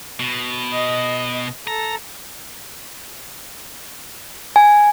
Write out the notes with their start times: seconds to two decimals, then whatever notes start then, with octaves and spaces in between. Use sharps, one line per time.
0.20 B2
0.72 D#5
1.67 A4 A#5
4.56 G#5